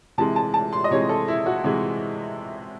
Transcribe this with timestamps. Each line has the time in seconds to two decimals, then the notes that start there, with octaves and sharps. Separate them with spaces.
0.18 C3 E3 G#3 A5
0.36 A5
0.54 A5
0.73 C6
0.84 D#5
0.91 C3 E3 G#3 C#5
1.09 A4
1.28 E4
1.46 F#4
1.64 C3 E3 G#3